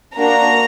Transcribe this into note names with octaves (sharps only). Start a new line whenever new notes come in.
A#3 D4 F#4 A#5